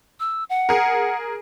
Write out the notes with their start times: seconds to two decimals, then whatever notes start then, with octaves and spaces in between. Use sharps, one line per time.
0.20 E6
0.50 F#5
0.69 G#4 A#4